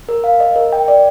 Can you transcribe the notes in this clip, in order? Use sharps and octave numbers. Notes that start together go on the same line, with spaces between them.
A#4
F5
D#5
A#4
G5
D5